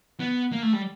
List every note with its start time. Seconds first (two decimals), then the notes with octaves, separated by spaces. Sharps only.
0.20 B3
0.52 A#3
0.63 A3
0.73 G3